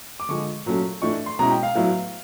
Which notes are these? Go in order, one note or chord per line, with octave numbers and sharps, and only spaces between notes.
D6
D3 F3 G#3 C#6
A#2 F#3 A3 C#4
A2 E3 A3 D4 C#6
C6
B2 G#3 C#4 E4 A#5
G5
F5
A2 F#3 B3 E4